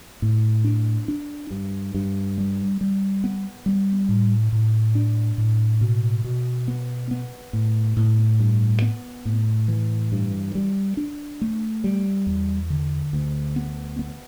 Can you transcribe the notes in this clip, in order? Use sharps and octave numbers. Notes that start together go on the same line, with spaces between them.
A2
D4
D4
G2
G2
G3
G3
B3
G3
A2
A2
D4
A2
B2
B2
B3
B3
A2
A2
G2
B3
A2
E3
G2
G3
D4
A3
G3
E2
D3
D2
B3
B3